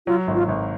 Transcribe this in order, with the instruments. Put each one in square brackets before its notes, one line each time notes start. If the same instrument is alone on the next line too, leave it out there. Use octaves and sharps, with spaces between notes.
[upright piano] F#3 [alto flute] F4
[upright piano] G#1
[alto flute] F4
[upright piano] G#1